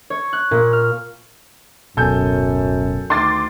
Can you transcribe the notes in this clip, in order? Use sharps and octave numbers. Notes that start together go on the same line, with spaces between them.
C#5
F#6
A#2
F6
D1 G#1 F#2 B2 A4 G#5 G6
D2 D#3 C6 D6 A6